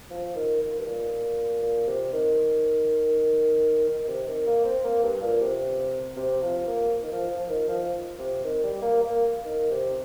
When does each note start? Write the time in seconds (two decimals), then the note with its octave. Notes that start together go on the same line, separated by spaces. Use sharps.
0.10 F3
0.35 D#3
0.61 D#3
0.79 G2
0.86 A#2
1.62 A#2
1.87 C3
2.13 D#3
3.89 D#3
4.08 C3
4.27 D#3
4.46 A#3
4.65 C4
4.84 A#3
5.03 G2
5.22 A#2
5.41 C3
6.17 C3
6.42 F3
6.67 A#3
7.02 D#3
7.12 F3
7.31 F3
7.49 D#3
7.68 F3
8.19 C3
8.44 D#3
8.63 G3
8.82 A#3
9.01 A#3
9.45 D#3
9.71 C3